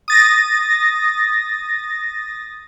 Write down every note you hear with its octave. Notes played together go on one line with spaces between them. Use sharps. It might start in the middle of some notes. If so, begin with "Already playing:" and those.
D#6 A6 A#6